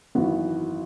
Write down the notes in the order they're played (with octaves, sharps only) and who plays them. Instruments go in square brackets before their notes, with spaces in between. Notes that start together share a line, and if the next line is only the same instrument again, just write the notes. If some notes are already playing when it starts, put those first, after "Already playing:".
[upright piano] G#1 F#2 E3 B3 F#4